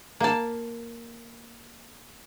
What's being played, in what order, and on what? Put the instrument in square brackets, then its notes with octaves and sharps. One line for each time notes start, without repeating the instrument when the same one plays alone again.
[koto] A#3 A5